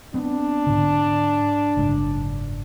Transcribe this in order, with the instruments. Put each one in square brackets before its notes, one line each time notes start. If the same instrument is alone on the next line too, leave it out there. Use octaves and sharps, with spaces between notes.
[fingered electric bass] B3 C4 [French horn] D4
[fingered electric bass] G#2 D3
F#1 G#2